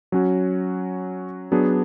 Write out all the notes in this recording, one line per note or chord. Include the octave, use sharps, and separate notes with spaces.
F#3 C#4 F#4
F#3 B3 D4 G#4